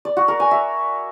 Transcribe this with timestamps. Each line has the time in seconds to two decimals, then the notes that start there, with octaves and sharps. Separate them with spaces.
0.05 D5
0.17 F#4
0.28 A#4
0.40 G#5
0.51 E5